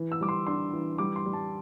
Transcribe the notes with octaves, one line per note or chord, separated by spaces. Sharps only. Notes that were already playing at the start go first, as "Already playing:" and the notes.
Already playing: E3
E6
G3 D6
C6
D4 C6
E3
G3 D6
C6
G3
A5